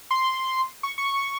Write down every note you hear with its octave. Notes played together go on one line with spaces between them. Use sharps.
C6
C#6
C#6